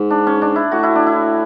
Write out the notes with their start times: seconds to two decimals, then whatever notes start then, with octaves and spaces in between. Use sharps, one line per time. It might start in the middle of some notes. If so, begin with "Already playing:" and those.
Already playing: G#2
0.10 D4
0.27 C#4
0.42 D4
0.56 E4
0.72 A2 F#4
0.83 E4
0.95 D4
1.07 E4